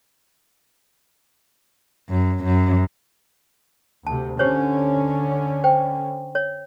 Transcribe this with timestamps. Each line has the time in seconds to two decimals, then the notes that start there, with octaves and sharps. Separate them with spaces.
2.11 F#2
2.45 F#2
4.07 D2 C3 A5
4.39 D3 C#4 G4 C5 C#5
5.64 C5 G5
6.35 C#5